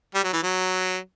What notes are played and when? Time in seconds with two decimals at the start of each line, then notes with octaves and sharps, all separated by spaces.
0.14 G3
0.24 F#3
0.33 E3
0.43 F#3